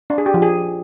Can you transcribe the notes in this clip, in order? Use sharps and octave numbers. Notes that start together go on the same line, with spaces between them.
D4
G#4
G4
F3
G#4